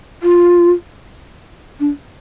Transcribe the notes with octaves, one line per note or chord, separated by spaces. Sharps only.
F4
D4